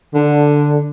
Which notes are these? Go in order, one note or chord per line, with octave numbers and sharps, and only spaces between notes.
D3